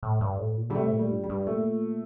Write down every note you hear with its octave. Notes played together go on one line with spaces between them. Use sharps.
A2
G2
A2
A#2
D3 G3
C3 A3
A2
A#2
G3
G2
G3
G2
A#2 A3